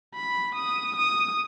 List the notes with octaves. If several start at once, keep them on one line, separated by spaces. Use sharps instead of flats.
B5
D#6
D#6